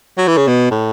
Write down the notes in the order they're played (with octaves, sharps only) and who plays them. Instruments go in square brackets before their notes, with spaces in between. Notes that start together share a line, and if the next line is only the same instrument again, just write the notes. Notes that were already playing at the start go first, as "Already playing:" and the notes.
[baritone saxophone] F#3
E3
C#3
B2
A2